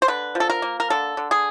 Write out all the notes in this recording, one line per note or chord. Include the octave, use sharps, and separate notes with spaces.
C5
D3 B4
F3
A4
A#4
A#3
A#4
D3 A4
D3
G#4